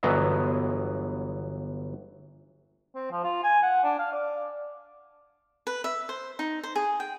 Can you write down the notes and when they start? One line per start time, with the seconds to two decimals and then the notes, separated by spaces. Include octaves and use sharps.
0.03 G1 E3 F#3 B3 D#5 E5
2.95 C4
3.11 F3
3.24 F4
3.43 G#5
3.63 F#5
3.84 D4
3.99 F5
4.13 D5
5.67 B4
5.84 E5
6.09 C5
6.39 D#4
6.63 C5
6.76 G#4
7.00 G5